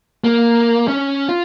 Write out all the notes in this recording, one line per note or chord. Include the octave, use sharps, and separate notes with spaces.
A#3
C#4
F4